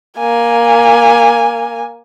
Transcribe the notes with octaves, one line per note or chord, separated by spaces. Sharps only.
A#3 G#5